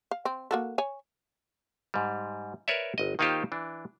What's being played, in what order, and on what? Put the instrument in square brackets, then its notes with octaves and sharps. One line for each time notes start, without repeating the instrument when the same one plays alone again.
[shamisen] F5
C4
A#3 F#4 A4
C#5 G#5
[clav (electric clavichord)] G#2 G3
A#4 B4 C#5 D5 E5
G1 D#5
D#3 A#3 D#4 F4 G4 C5
E3 D4